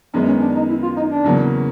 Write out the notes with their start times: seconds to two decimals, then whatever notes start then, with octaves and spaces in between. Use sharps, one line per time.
0.14 F#2 D#3 G3 G#3 B3
0.28 C#4
0.41 D4
0.55 D#4
0.69 E4
0.83 F4
0.96 D#4
1.11 D4
1.25 E2 C#3 F#3 A#3 C#4